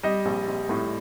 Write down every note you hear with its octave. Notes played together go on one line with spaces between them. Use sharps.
G3 D#5
A#1
A#1
A2